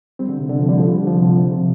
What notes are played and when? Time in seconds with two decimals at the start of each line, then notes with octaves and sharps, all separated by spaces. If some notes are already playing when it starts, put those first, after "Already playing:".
0.19 G3 C4
0.29 D3
0.39 C3
0.49 D3
0.59 C3 F3
0.68 D3 G3
0.78 F3 A3
0.88 D3 G3
0.98 D3
1.07 C3 F3
1.23 C3 F3
1.36 D3
1.51 C3 F3